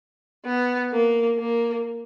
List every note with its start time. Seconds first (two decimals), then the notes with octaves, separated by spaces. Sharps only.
0.45 B3
0.92 A#3
1.39 A#3